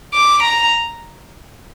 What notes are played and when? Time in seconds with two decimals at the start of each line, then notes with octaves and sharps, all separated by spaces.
0.14 D6
0.43 A#5